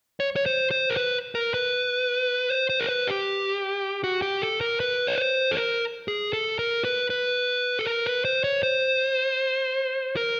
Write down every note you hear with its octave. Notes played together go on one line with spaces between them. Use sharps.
C#5
C#5
C5
C5
A#4
B4
A#4
B4
C5
C5
A#4
B4
G4
F#4
G4
A4
A#4
B4
C#5
C5
A4
A#4
G#4
A4
A#4
B4
B4
A4
A#4
B4
C5
C#5
C5
A#4